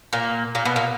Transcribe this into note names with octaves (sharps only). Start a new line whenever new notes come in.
A#2 A#3
A#2 A#3
B2 B3
A#2 A#3